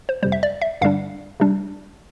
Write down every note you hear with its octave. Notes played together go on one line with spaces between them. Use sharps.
C5
F2 C3 G3 C5
E5
D5
E5
G2 D3 G3 D4 F5
C3 G3 D4